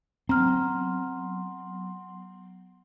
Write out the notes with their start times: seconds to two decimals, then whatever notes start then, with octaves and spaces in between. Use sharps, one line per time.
0.29 F#3 B3 C4 A#5 C6 F6